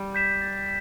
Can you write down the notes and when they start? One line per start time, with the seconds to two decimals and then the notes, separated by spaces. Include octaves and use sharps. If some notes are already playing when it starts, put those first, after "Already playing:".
Already playing: G3
0.15 G6 B6 E7
0.42 A6